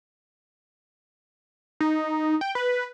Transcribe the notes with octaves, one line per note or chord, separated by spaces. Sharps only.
D#4
G5
B4